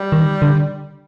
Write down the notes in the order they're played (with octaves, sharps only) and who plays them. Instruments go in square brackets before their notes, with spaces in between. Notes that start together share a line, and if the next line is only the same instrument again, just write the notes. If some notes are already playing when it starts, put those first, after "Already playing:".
Already playing: [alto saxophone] G3
[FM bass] D#3
D3